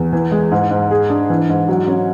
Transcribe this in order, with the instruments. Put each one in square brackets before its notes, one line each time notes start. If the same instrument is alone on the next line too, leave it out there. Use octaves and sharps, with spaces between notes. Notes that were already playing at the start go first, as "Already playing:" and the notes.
Already playing: [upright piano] E2
E3
G#3
G#2
G#2
G#4
D4
E3
G#2
F#3
C#4